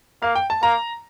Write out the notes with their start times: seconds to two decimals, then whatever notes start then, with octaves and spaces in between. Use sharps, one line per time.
0.22 A#3 F5
0.35 G5
0.50 A5
0.62 A#3 A#5